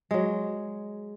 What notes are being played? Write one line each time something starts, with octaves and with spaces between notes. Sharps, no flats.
F#3 G#3